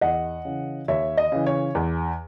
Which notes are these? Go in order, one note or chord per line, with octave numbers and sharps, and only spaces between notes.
E2 D#5 F#5
C#3 E3
D#2 C#5 E5
D#5
C#3 E3
C#5
E2